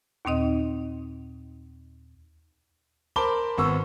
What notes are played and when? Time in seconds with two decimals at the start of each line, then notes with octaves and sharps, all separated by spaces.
0.25 D#2 A#2 C4 D#4 D#5
3.16 A#4 C5 A5 B5 D6 G7
3.58 G#1 B3 C#6 E6